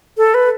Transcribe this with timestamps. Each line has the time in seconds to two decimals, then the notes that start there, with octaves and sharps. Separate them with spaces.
0.17 A4
0.34 B4